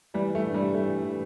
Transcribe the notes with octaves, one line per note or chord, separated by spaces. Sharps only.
E3 G3
A3
G2
G3
E3 A3
E3